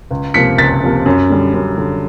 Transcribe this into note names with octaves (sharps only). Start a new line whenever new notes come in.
C#2
C3 F3 A#3 B6 C#7
C#2 A6 B6
C3 F3 A#3
F#2
D3 G3
F#2
D3 G3